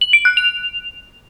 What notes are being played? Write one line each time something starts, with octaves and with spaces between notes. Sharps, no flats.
F#7
D7
F#6
F7